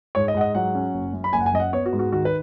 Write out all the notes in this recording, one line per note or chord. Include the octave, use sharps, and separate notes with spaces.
G#2 C#5
D#5
G#2 F#5
D#5
F#3 F#5
C#4
F#1
F#2
B5
F#1 G#5
F#5
G#5
F#2 D#5
F#5
B3 C#5
F#4
G#2
F#4
D#3 F#4
B4